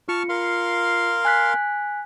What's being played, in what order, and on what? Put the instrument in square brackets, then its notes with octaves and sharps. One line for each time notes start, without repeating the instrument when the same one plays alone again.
[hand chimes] F4 C#7 [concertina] A5 C#6 F6
[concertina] A#4 F5 C6
[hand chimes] G#5 F#6 B6